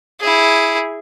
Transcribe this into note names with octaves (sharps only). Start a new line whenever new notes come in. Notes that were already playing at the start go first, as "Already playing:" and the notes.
E4 G#4